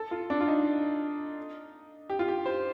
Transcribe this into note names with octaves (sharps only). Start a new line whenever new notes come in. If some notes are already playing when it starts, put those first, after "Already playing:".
Already playing: A4
F4
D4
F4
D#4
G4
F4
G4
C5